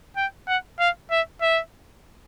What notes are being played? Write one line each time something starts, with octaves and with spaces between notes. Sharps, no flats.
G5
F#5
F5
E5
E5